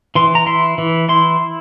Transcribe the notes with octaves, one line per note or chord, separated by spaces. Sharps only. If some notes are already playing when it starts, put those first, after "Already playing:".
E3 C6
A#5
E4 C6
E3
E4 C6